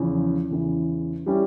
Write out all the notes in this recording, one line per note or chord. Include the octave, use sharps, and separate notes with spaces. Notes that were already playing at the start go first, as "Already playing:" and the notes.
Already playing: E2 C#3 F3 C#4
E2 C#3 E3
G3 C#4 E4 G4